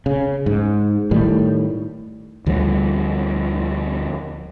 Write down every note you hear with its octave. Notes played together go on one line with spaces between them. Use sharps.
C#3
G#2
A2 D#3 G3
D2 D3 F3 G3